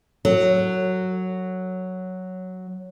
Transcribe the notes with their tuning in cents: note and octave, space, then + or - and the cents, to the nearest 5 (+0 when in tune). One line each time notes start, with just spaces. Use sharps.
F#3 +0 A4 +40